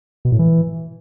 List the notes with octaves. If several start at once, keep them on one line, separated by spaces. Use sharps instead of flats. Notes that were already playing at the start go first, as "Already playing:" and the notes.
B2
A2
E3